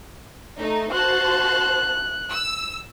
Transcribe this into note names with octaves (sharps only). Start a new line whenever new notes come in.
A3 D#4
F#4 C5 A5 F#6
E6